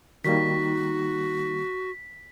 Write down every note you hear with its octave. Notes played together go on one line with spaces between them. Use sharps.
D#3 G3 A#3 D#4 F#4 B6